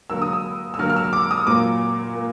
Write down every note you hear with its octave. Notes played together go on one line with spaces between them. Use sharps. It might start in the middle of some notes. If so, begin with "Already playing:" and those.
D3 F#3 A#3 E6
D#6
E6
E6
D3 F#3 A#3 F6
F6
E6
D6
D#6
A#2 F#3 A#3 D6
A#3